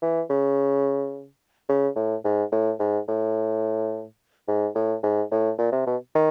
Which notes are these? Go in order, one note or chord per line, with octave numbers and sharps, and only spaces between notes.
E3
C#3
C#3
A2
G#2
A2
G#2
A2
G#2
A2
G#2
A2
A#2
C3
B2
D#3